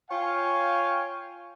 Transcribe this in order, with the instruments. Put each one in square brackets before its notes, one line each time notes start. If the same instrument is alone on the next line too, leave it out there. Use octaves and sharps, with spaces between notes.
[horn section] F4 C#5 F5 G5 G#5